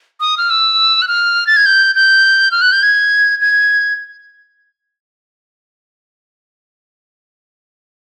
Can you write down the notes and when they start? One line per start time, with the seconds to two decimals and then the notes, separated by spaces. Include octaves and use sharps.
0.20 D#6
0.38 F6
0.50 E6
1.02 F#6
1.08 F6
1.47 A6
1.56 G#6
1.66 G6
1.95 G6
2.51 F6
2.61 F#6
2.72 G6
2.83 G#6
3.41 G#6